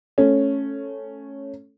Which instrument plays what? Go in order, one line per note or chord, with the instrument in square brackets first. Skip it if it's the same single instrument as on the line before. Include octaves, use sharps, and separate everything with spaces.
[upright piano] A3 C#4